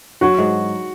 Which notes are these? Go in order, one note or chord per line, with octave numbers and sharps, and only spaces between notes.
F#3 F#4
G#2